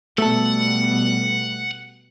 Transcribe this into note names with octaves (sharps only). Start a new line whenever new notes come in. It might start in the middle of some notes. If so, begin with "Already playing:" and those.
B2 G3 A3 B3 A4 F#5